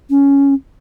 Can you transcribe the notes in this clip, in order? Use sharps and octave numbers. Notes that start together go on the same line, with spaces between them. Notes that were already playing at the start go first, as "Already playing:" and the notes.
C#4